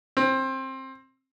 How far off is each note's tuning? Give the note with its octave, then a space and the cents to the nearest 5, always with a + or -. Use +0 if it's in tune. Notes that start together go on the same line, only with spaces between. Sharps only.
C4 +20